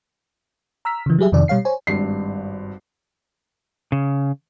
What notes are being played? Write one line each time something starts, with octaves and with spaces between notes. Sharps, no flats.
A#5 E6 F6 B6
C#3 E3
F#3 G3 G4 G#4 E5
F2 C3 D#3 D5
B2 G3 C#5 F5 C7
C5 C#5 G#5
G#1 G2 C7
C#3